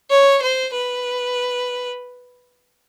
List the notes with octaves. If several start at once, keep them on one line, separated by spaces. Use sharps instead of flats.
C#5
C5
B4